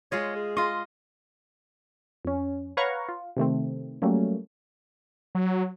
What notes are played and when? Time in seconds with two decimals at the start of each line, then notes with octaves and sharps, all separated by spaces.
0.12 G#3 F4 C#5 D#5
0.36 G#4
0.57 F4 D#5 C6
2.25 F2 C#4
2.77 B4 C#5 F5 F#5 A#5 C#6
3.09 F4
3.37 C3 D#3 A3 C4
4.02 F#3 G3 A3 A#3 C#4
5.35 F#3